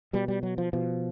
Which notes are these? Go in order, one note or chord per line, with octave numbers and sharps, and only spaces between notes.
B2 G3
G3
F#3
F3
B2 F3